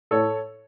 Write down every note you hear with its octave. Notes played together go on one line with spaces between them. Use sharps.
A2 A4 C#5